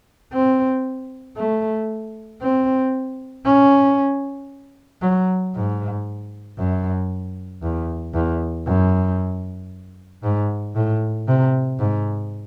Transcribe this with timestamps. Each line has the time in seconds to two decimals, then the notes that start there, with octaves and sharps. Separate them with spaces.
0.33 C4
1.36 A3
2.41 C4
3.45 C#4
5.02 F#3
5.54 G#2
6.58 F#2
7.63 E2
8.14 E2
8.67 F#2
10.23 G#2
10.75 A2
11.28 C3
11.79 G#2